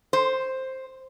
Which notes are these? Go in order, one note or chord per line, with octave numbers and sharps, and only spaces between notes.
C5